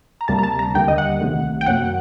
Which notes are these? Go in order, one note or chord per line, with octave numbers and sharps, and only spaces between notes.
A#5
D2 C3 G3 A#3 A5
A#5
A5
A#5
D#2 D3 G3 A#3 G5
D#5
F#5
C2 C3 D#3 A3
G5
F#2 F#3 A#3 F#5